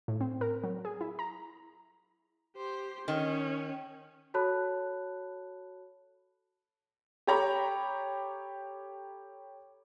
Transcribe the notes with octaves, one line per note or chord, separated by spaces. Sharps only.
A2
C4
A#4
F#3
G#4
E4
A#5
G4 C5
D#3 C#4
F#4 A4 C#5 A5 B5 F#6
G4 A4 C#5 A#5 B5